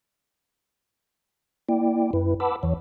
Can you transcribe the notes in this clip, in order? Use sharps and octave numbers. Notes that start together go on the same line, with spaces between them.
A#3 E4 D5 G5
F#2 E4 B4
B4 F#5 A5 B5 D6 E6
E2 E3 C#5